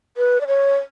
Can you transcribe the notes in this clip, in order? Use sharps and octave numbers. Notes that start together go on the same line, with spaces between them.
B4
D5
C#5